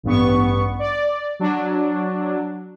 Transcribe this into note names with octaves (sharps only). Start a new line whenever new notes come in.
A1 G2 B3 C#6
D5
F#3 D4